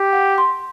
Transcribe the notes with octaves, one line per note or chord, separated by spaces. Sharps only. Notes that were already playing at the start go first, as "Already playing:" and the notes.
Already playing: G4
F#5
C6